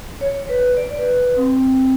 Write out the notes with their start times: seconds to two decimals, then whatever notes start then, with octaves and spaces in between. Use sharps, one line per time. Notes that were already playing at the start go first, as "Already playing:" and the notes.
0.21 C#5
0.49 B4
0.77 D5
0.98 B4
1.36 C4